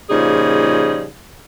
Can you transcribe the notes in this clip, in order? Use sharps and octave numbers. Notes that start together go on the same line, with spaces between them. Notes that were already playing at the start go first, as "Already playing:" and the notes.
A#2 C#3 F3 G3 D#4 G#4